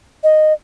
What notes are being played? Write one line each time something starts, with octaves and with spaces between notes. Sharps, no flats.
D#5